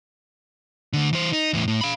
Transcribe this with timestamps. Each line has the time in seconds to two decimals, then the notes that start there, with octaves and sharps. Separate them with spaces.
0.93 D2 D3
1.13 E3 C5
1.33 D#4
1.53 E2 A2
1.68 A2
1.81 F5 B5